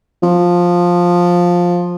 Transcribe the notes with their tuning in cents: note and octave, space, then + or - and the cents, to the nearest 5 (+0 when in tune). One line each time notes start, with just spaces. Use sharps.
F3 +10